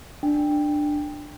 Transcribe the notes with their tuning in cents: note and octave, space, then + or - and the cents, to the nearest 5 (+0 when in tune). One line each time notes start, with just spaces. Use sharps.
D4 +15 G5 +10